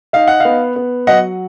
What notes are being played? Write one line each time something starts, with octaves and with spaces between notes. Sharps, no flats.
D#4 F5
F#5
B3 F5
B3
F#3 D#5 F#5